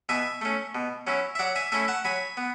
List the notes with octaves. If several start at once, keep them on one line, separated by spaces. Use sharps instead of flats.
B2 E5 G#5
A3 C#4
B2
F#3 C#4 E4
E5
F#3 D5 F#5
E5 G#5
A3 C#4 E4 E5 G#5
F#5 A5
F#3 G#5 B5
B3